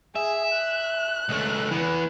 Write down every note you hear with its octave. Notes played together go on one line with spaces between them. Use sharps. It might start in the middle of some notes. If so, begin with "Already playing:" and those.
G#4 E5
F#6
C#2 A3
E3 B3